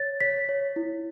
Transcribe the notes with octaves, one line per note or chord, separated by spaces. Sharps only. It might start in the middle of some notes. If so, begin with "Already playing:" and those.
Already playing: C#5 A6
C#5 B6
C#5
E4